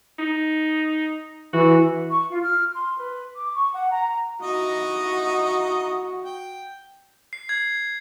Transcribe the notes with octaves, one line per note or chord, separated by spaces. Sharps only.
D#4
E3 F#4
C#6
F4
F6
C6
B4
D6
C#6
F#5
A#5
D#4 E4 F#4 D#5
G5
C7
G#6